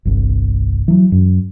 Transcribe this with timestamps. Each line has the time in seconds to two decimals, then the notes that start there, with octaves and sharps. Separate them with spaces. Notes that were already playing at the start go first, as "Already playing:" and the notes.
0.05 G1 C2
0.88 E3 F#3
1.12 F#2